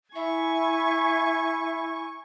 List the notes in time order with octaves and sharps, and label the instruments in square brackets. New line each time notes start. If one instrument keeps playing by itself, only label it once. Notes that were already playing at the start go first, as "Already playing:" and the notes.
[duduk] E4 [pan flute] E5 [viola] G#5 [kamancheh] C#6